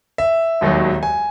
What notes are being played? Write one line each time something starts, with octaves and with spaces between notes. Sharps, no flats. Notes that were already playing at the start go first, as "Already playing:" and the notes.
E5
E1 D#2 D#3 F#3
G#5